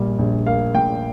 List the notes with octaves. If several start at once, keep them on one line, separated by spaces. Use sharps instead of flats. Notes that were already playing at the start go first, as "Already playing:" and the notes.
Already playing: A#1 A#2 G3 A#3
A#1
A#3 F5
A#2 G5